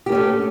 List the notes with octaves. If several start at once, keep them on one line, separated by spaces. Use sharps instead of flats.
A3 A#3 C#4 G4